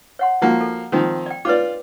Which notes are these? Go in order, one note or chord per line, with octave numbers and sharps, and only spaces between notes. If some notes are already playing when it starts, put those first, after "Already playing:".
C#5 F#5 C6
F3 A#3 F#4
A4
D#3 F3 C4
D5 G5
F4 B4 C#5 D5 D6